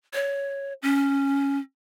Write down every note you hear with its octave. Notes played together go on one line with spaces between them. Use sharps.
C#5
C#4